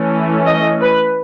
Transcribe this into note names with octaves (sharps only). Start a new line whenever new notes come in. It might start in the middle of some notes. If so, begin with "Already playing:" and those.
Already playing: E3 A3 C#4
D#5
B4